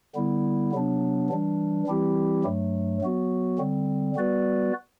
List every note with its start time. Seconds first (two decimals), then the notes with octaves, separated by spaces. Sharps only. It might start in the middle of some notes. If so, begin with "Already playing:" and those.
0.15 D3 G3 B3 E4
0.73 C3 F#3 B3 D4
1.30 E3 G3 D4
1.87 E3 G3 C4 E4 G4
2.44 G2 F#3 A3
3.01 F#3 B3 F#4
3.58 D3 G3 C4
4.15 G3 B3 F#4 B4 D5